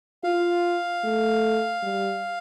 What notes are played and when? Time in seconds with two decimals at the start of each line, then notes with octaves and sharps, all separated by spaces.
0.24 F4 F5
1.04 A3
1.83 G3